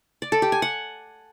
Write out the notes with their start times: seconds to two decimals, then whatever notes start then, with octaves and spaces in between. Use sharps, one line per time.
0.22 D5
0.32 A4
0.42 G4
0.52 G#5
0.62 F#5